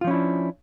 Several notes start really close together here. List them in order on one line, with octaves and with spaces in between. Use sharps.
F4 F3 C#4 E4 D4